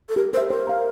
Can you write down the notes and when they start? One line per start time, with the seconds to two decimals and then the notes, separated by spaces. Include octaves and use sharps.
0.09 A4
0.16 G4 A#4
0.33 A#4 C5
0.37 E5
0.50 A#4 C5
0.67 F5 A#5